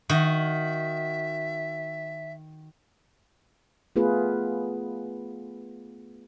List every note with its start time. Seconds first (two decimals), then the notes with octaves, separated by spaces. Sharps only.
0.09 D#3 F#4 E5
3.96 A3 B3 F4 G#4 B4